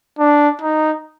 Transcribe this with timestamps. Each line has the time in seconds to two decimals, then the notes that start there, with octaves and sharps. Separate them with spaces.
0.19 D4
0.61 D#4